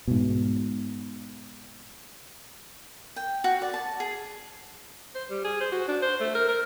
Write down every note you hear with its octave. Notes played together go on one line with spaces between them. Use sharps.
G#2 B2
G5
F#4
D5
A5
G#4
C5
G3
G#4
C5
F#4
D4
C5
A3
A#4
A#4